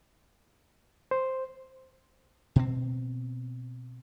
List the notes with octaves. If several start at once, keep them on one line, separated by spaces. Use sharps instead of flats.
C5
B2 C4